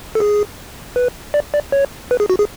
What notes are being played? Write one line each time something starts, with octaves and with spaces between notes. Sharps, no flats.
A4
G#4
B4
D5
D5
C#5
B4
G#4
F#4
G#4